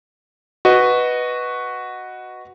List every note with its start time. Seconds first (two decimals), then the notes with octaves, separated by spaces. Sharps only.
0.65 F#4 B4 D#5